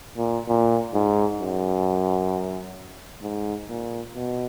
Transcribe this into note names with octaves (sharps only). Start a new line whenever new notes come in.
A#2
A#2
G#2
F#2
G#2
A#2
B2